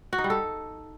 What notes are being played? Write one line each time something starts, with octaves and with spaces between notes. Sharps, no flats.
F#4
D#4
G3
A4